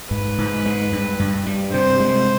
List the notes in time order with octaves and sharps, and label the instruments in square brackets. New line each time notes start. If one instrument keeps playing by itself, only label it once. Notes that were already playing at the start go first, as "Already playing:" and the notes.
[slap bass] G#2 [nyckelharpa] B4
[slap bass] G#2
G#3
G2
G2
G3
[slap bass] C3 [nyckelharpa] C5
[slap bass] G#3